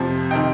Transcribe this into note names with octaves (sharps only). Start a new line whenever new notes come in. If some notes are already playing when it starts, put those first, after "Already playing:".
Already playing: F2 C3 F3
C3 D#3 D#5 G5